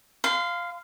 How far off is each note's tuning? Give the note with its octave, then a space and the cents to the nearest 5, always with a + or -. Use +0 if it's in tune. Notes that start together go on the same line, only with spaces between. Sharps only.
F5 +0 C6 -35